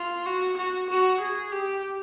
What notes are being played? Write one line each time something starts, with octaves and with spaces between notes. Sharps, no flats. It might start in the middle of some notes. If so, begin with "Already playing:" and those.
Already playing: F4
F#4
F#4
F#4
G#4
G4